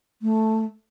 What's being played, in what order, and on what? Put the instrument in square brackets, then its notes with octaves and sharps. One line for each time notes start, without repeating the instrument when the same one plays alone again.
[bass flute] A3